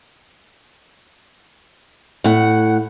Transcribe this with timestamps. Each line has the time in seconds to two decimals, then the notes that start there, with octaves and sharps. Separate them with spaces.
2.24 A2 F#5